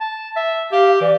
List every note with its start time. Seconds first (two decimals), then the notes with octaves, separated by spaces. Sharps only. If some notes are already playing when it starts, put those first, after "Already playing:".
0.01 A5
0.36 E5
0.72 G4 F5
1.01 E3 D5